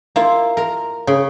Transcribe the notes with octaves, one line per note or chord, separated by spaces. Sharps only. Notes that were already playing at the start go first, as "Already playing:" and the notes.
A#3 E4 F4
A#4 A#5
C#3